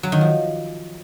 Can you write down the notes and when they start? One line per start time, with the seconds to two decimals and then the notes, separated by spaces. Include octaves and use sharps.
0.03 F#3
0.12 D#3
0.21 F3